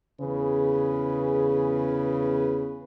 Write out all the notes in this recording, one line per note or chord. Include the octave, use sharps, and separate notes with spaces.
E2 C#3 G#4 B4